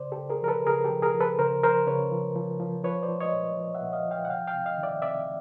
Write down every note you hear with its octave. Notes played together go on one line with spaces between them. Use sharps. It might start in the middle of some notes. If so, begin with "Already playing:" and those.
Already playing: C#3 C5 D5
G4 A4
C#3
G#4 A#4
F3 A#4
A4 B4
C#3 G#4 A#4
G4 A4
F3
G#4 A#4
F3
A4 B4
C#3 A#4 C5
F3 A#4 C5
C#3 B4 C#5
F3
F3
F3
F3 B4 C#5
C5 D5
F3
C#5 D#5
A#2
F3
E5 F#5
A#2
D#5 F5
F3
F5 G5
F#5
C3 F5 G5
F5 G5
C3
D#5 F5
D#3
D5 E5
C3 D5 E5